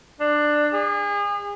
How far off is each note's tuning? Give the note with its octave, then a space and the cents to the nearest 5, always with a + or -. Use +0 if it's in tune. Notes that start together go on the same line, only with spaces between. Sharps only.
D4 +15
G#4 -35